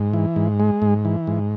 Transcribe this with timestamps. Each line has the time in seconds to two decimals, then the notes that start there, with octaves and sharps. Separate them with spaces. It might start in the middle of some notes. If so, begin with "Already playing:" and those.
Already playing: G#2
0.13 E3
0.36 G#2
0.60 G#3
0.82 G#2
1.05 E3
1.27 G#2